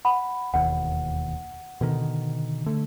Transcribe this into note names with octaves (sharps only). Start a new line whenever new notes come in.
F#5 B5
E1 D#2 F#5
B2 D3 D#3
D3 A3